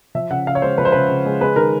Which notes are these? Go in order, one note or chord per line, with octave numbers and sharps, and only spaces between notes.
F3 E5
C#3 F#5
C#3 F5
C#5
G#3 C5
F3 B4
C5
C#3 B4
C#3
G#3
G#3 B4
D#3 A#4